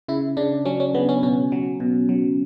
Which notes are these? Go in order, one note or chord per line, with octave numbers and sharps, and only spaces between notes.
C#3 E4
C#3 D4
F#3 C#4
C#4
C#3 B3
C#4
B2 C#4
F#3
B2
F#3